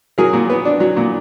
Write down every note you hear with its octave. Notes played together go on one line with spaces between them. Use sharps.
F#3 G#4 A#4
A#2
B3
D4
F#3
A#2